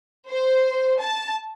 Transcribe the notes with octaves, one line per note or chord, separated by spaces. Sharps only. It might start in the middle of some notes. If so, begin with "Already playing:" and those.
C5
A5